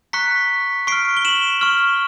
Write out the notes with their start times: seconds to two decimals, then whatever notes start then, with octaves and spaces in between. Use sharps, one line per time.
0.13 A#5 C#6 F#6 B6 C#7
0.87 C#6 F6 C7 D7
1.17 G7
1.25 E7 F#7
1.61 C#6 F6